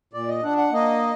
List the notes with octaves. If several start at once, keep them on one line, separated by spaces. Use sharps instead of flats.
A#2 D5
D#5
D4 F#5
F#5
A#3 D#5